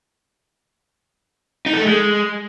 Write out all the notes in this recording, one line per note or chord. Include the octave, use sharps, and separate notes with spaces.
D#4
A4
A3
G#3